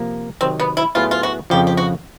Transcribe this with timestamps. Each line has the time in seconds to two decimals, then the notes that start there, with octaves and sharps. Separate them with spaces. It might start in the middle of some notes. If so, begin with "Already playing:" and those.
Already playing: C3 F3 A#3
0.41 C3 D#3 F#3 C4
0.60 B3
0.77 E4
0.95 A2 F#3 B3 E4 F4 G#4
1.11 F4
1.23 F#4
1.50 F2 C#3 F3 G4
1.67 G4
1.77 F#4